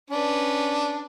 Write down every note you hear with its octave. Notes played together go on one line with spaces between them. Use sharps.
C#4 D4 B4